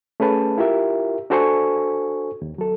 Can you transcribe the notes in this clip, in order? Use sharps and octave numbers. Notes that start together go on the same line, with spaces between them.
A3 C#4 G#4 B4 A5
E4 F4 G4 A#4 E5
D4 F#4 A4 C5 G#5 C#6
D#2
F#3 A4